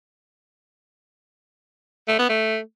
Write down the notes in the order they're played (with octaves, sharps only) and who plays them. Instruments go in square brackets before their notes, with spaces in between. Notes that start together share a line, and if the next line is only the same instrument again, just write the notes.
[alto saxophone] A3
B3
A3